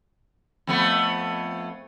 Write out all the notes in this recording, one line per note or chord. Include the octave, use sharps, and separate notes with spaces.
F2 A3 B3